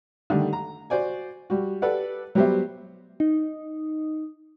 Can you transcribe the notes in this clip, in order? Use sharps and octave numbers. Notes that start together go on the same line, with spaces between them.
D3 D#3 G3 A3
A#5
F#4 C5 D5 G#5
G3 F#4
G4 A4 B4 D5 F#5
F#3 G3 B3 G4 C5 E5
D#4